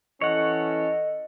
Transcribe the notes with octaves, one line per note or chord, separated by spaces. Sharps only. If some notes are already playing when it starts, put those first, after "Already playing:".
E3 C#4 A4 C#5 D#5 F#5